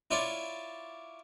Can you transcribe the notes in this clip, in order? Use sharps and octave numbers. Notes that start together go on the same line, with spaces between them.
E4 F4 C#5 D5